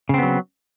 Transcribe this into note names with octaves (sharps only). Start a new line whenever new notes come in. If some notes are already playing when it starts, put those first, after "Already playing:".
C#3 F#3 B3 C4